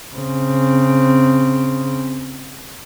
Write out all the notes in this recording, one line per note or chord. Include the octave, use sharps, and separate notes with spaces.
C#3 C4